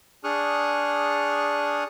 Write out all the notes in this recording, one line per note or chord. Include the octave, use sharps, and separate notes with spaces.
D4 G#4 C#6 D#6 F6 F#6